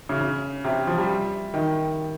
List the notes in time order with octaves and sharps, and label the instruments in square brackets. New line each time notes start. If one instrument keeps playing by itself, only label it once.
[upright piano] C#3
C#3
C3
F3
G3
D#3